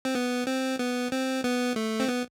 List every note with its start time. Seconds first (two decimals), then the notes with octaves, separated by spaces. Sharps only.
0.05 C4
0.15 B3
0.47 C4
0.79 B3
1.12 C4
1.44 B3
1.76 A3
2.00 C4
2.08 B3